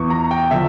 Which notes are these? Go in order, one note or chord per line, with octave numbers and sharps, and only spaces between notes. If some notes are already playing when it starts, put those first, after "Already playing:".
Already playing: E2 E3 C#6
A#5
G5
D3 F3 E5